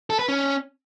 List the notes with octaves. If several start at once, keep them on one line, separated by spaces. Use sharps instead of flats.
A4
B4
C#4